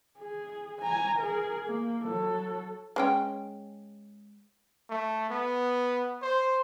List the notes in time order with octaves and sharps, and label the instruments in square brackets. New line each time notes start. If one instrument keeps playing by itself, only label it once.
[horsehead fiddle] G#4
G#5 A#5
G#4 A#4
A#3
F#3 A4
[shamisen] G#3 C#4 G5
[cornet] A3
B3
C5